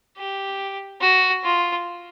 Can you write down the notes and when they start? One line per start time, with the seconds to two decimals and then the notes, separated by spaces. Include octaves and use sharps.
0.17 G4
1.01 F#4
1.44 F4